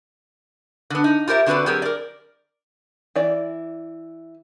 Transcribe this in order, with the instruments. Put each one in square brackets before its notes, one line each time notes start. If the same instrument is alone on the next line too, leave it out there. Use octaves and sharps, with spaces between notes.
[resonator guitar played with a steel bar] D3 B3
D#4
F4 G4 A#4 C5 E5
D3 C4 F#4 A4 B4 D5
F#3 C4 G4 G#4 A#4
A#4 D5
[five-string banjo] E3 D5